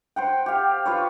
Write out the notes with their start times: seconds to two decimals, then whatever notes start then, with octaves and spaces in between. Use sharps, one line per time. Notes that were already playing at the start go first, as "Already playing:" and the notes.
0.16 C5 F#5 G5
0.46 G4 F5
0.86 F4 B4 C#5